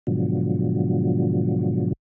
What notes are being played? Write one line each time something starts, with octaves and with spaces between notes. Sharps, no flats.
G#2 B2 D3 F3 F#3